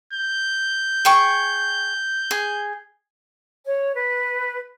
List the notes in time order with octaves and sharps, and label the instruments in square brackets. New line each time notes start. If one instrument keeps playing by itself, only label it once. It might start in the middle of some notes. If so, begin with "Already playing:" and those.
[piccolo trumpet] G6
[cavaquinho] G#4 G5 C#6
G#4
[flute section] C#5
B4